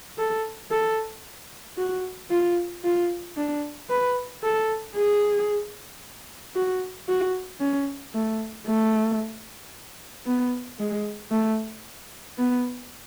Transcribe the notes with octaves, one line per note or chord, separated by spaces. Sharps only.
A4
A4
F#4
F4
F4
D4
B4
A4
G#4
F#4
F#4
C#4
A3
A3
B3
G#3
A3
B3